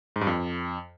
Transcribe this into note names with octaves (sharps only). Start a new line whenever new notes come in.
G#2
G2
F2